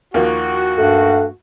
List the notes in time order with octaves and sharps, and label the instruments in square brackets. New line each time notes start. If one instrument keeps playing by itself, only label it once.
[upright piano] D#2 F3 A#3 [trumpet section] F#4
[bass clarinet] G2 [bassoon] A3